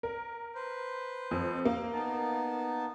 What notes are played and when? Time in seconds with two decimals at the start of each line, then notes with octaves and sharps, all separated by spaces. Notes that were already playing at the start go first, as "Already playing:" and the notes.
0.03 A#4
0.55 B4 C5
1.31 F2
1.65 A#3
1.93 B3 D#4 A5